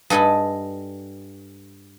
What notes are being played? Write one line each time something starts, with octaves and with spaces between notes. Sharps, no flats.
G2 A4 D#5 G#5 B5